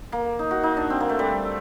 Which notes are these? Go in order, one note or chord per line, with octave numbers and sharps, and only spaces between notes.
A#3
D#4
F#4
D#4
D4
C4
A#3
A3
G3